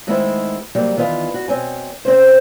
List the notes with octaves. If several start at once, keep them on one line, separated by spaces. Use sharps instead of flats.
D#3 G#3 A3 B3 C4 E4
C3 F#3 G3 A#3
D#3 E3 B3 F4
F#4
B2 D#3 C4 C#5 G#5
C3 C4 C#4 C5